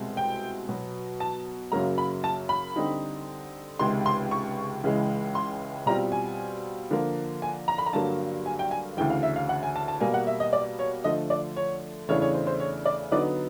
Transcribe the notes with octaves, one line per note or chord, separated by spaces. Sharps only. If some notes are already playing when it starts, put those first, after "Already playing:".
Already playing: C2 B2 G#3 C4
G5
B2 F#3 B3
A5
F#2 C#3 F#3 A#3 A#5
B5
A5
B5
D3 G3 C4 D#4
C#2 C3 D#3 G#3 C6
C6
C#6
C#2 C#3 E3 G#3
C6
B2 G3 C4 F4 A#5
G#5
D3 F3 A#3
G#5
A#5
B5
A#5
G2 D3 F#3 A#3 A5
G#5
G5
G#5
D2 C#3 E3 G5
F5
E5
F5
F#5
G#5
A5
A5
B2 G3 A#3 G#5
F#5
E5
D#5
D5
C#5
D3 F3 A3 D#5
D5
C#5
E2 C#3 E3 A3 D4 C#5
C#5
C5
C5
C#5
D5
D3 F#3 B3 D#4 D5